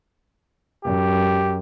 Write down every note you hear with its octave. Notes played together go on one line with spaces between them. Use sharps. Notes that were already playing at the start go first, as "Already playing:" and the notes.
F#2 G4